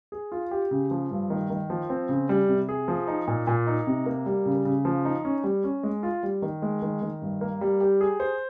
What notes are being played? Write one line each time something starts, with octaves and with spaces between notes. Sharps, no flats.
G#4
F4
G4
C#3
F3
G2
D#3
D#3
F3
C4
C#3
G3
C3
G#4
F3
D#4
A#2
A#2
D#4
C3
A#3
G3
C#3
C#3
F3
D#4
C#4
G3
C#4
G#3
F4
G3
D#3
G#3
D#3
D#3
G2
A#3
G3
G4
G#4
C5